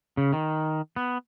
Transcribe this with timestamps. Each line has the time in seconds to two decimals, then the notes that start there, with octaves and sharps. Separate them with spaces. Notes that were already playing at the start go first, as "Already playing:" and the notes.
0.17 C#3
0.33 D#3
0.96 B3